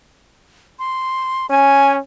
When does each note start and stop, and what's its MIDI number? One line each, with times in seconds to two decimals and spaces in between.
0.79 1.46 84
1.50 1.98 61
1.50 1.93 80